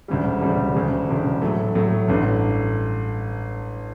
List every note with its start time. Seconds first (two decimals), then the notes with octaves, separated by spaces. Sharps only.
0.08 E1 D2 C#3 G3
0.42 E1 D2 C#3 G3
0.75 E1 D2 C#3
1.09 E1 D2 C#3
1.41 A2 F#3 A3
1.75 A2 F#3 A3
2.08 A1 G2 D3